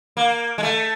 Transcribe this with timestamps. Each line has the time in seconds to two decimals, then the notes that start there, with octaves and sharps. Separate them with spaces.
0.17 A#3
0.58 G#3
0.63 A3